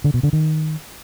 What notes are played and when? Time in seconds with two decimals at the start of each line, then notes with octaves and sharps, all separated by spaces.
0.04 D3
0.14 B2
0.23 D3
0.33 D#3